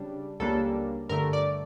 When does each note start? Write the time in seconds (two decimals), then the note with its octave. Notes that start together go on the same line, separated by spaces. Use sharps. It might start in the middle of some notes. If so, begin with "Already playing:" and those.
Already playing: C#3 G3 D4
0.40 C#2 C#3 G3 A#3 D4 A4
1.09 G2 D3 A3 A#4
1.33 D5